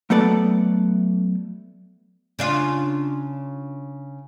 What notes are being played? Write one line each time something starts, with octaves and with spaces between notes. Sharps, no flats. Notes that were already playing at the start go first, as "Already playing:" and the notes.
F#3 A3 B3 A4 D5
C#3 D4 F4